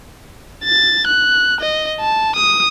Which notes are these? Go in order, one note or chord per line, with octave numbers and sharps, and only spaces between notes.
A6
F#6
D#5
A5
D#6